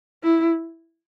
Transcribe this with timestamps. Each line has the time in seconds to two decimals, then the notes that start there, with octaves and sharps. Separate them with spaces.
0.23 E4